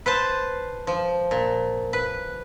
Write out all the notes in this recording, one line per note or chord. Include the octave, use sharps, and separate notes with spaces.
B4 C5 A5
F3
A#2
B4